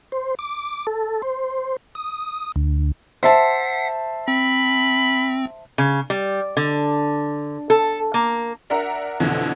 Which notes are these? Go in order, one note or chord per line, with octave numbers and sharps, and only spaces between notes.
C5
D6
A4
C5
D#6
D2
C5 E5 F#5 A5 B6 C7
C4 B5
C#3
G3
D3
A4
A#3
D4 A#4 E5 F#5 A#5
F2 B2 D3 E3